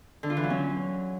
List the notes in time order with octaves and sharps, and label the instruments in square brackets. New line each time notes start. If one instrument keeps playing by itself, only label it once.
[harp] D3
F4
E3
F#3
C#4